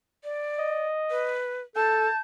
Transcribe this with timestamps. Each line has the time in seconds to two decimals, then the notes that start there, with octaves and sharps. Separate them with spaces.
0.24 D5
0.59 D#5
1.11 B4
1.76 A4 A5 G6